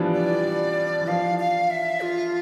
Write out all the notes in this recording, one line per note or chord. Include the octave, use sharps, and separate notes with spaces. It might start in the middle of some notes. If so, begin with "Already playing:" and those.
Already playing: E3 F3 G3 B3 D4
D5
E3
F3 F5
F5
E5
F4